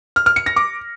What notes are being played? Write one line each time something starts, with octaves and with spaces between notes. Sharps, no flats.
F6
F6
C#7
A#6
D6